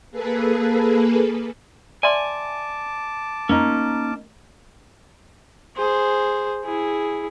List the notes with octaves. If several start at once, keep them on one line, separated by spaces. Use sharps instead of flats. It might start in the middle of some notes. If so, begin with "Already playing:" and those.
A#3 G#4 A4 B4
D5 E5 G#5 A5 C6 D6
A#3 C#4 D#4
G#4 C5
E4 G#4